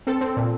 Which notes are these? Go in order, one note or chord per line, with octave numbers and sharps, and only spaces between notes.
C4 A4
C4
A#2